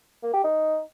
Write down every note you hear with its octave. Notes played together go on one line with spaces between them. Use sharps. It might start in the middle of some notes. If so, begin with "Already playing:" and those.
A#3
G4
D#4